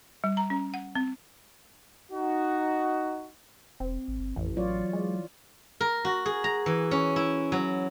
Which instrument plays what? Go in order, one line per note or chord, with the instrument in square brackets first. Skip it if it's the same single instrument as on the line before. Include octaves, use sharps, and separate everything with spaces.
[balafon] G3
A#5
C#4
F#5
C4
[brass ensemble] D#4 F#4
[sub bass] E1 [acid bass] C4
[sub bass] G#1
G1
[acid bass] A1 [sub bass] F2 [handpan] E3
[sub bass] F#3 [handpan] F4 C#5 D5
[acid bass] G#3
[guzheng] A#4
F#4
G#4
A#5
E3
C#4
E4
F#3